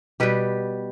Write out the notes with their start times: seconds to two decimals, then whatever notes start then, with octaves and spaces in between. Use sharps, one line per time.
0.20 B2 G3 G4 B4